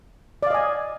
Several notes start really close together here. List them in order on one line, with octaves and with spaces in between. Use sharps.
D5 F5 D#5 G#5